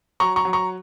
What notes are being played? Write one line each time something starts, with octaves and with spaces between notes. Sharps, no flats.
F#3 A#5 C#6
A#5 C#6
F#3
A#5 C#6